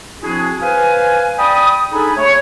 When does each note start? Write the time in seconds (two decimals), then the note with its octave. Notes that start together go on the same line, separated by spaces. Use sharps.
0.21 F3 C4 D4 E4 F#4 G#4
0.62 B4 C5 F5 G#5
1.39 D5 G5 B5 D#6
1.92 D4 D#4 G#4 A4 G#5 B5
2.16 A3 C#5